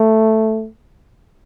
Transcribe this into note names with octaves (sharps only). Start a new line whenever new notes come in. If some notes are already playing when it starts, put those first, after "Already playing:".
Already playing: A3